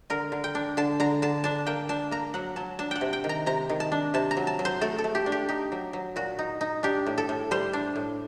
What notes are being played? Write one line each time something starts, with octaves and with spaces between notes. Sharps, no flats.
D3 A#4
D3
G5
D4
D3 A5
D3 A#5
D3 A5
D4 A5
A#3 G5
D4 A5
A#3 A#5
F#3 F#5
F#3 A5
D4 A5
F#5 G5
C3
G5
D#3
A#5
C3 A#5
D#3
A5
D4
C3 A5
A#5
F#3
A5
F#3
C5
A3 A4
A4
A3
G4
D4
G4
D#4 G4
F#3
F#3
A#2 F#4
D#4
D#4
D4 G4
A2
A4
A2
G3 C5
D4
A2